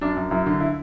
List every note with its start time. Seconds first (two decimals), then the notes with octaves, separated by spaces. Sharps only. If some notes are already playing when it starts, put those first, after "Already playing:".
0.01 F#2 D4
0.16 F#2
0.31 F#2 E4
0.46 D3
0.60 E4